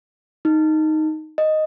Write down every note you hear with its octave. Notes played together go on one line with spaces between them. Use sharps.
D#4
D#5